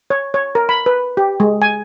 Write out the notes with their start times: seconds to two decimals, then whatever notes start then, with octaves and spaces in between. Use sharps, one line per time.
0.10 C#5
0.34 C#5
0.55 A#4
0.69 B5
0.86 B4
1.17 G4
1.40 G#3
1.62 G#5